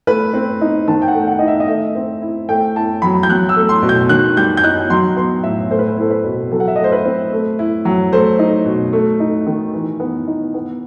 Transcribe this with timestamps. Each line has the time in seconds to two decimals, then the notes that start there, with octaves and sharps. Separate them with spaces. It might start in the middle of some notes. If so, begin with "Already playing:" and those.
0.07 A3 B4
0.34 C4
0.61 D#4
0.88 D#3 A5
1.02 G5
1.08 F#5
1.14 A3
1.27 F#5
1.39 D#4 D#5
1.48 E5
1.60 D#5
1.68 A3 E5
1.95 C4
2.22 E4
2.49 A3 G5
2.76 E4 A5
3.02 F#3 B5
3.23 G6
3.29 F#3 F#6
3.49 E6
3.56 A3
3.69 C6
3.82 B2
3.89 G6
4.09 D#3 F#6
4.37 G3 G6
4.57 G6
4.64 D#4 F#6
4.90 F#3 C6
5.17 B3 C6
5.43 A2 E5
5.71 A3 C5
5.79 B4
5.88 C5
5.97 E4 A4
6.10 B4
6.24 B2
6.52 F#3 A4
6.60 F#5
6.68 E5
6.76 D#5
6.79 A3
6.84 C5
6.92 B4
7.06 C4
7.32 A3
7.59 E4
7.85 F#3
8.12 A3 C5
8.39 D#4
8.66 B2
8.93 A3
9.20 D#4
9.47 D#3
9.74 E3
10.00 B3
10.28 D#4
10.54 B3